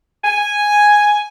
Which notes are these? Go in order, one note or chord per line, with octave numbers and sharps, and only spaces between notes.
G#5